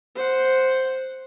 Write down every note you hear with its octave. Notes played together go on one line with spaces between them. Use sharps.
C5 F#5